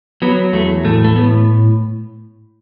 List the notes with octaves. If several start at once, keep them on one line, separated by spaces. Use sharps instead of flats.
F#3 B3
E2 A3
A2 A3
A3
A2 B3